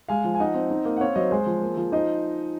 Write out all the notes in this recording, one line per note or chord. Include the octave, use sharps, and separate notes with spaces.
G#3 F5 G#5
F3
G#5
D#4 D#5 F#5
C4
D#4
A#3
F#5
C4 C#5 F5
F#3 C5 D#5
G#3 G#4 C5
F3
A#3
F3
D#4 C5 D#5